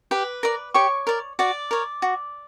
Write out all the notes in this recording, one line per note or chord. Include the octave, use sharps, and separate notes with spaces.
G4 B4 B5
A#4 D5
G4 C#5 C#6
A#4 D5
F#4 D5 D6
A#4 C#5
F#4